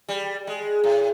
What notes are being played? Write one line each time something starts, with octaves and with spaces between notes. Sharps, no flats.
G3
G#3
A2